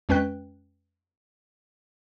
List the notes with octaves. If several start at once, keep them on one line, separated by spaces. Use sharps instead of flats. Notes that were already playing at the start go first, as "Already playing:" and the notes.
F2 G#3 C#4 B4 G5 F#6